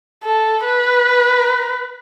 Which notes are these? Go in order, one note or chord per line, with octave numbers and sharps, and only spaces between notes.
A4
B4